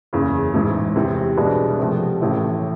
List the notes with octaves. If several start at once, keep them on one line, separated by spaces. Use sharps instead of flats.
F#1 E2 C#3
A1 G#2 E3
E2 C3 E3
C2 B2 G#3 B3 D4
C3 F3 A3
A1 A2 E3 A3